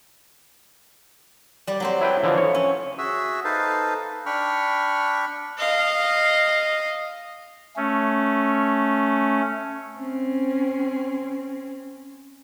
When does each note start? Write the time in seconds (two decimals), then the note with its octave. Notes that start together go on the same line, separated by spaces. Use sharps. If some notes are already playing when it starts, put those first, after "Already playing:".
1.67 G3 D5
1.80 F#3 C4 C5
2.01 E4 B4 G5
2.23 D3 E3 F3
2.38 C#5
2.55 C#4
2.98 F#4 G#4 E5 E6
3.45 D#4 A4 B4 C5 F5 A5
4.26 D4 G5 B5 C#6 F6
5.58 D#5 F5
7.76 A3 C#4
9.98 C4 C#4